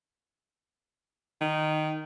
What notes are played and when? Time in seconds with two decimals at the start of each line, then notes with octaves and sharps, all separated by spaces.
1.41 D#3